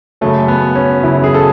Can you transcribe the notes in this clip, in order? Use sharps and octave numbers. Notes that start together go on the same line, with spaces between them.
F#2 C#3 F#3 A3
B3
C#4
F#2 C#3 F#3 E4
G#4
A4